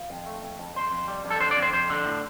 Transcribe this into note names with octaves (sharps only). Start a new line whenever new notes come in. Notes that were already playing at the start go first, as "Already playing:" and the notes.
Already playing: F4
F2
A3
F2
F2
F2 C5
F2
G3
F2
A4
D3 C5
D5
F2
C5
F2 C5
D3
A2